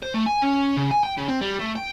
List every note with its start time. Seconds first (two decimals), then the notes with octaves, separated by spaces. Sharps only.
0.03 C5
0.15 A3
0.26 G#5
0.42 C#4
0.77 C#3
0.91 G#5
1.04 G5
1.18 C#3
1.29 C4
1.41 G3
1.59 A3
1.76 G5